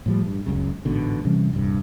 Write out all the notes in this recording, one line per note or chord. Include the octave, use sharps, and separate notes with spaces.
A2 F3 G3
G2
F#1 C#2 F#2 C#3
A1 G#2 B2 D3
C3 E3 G3 C#4
D#1 C2 G2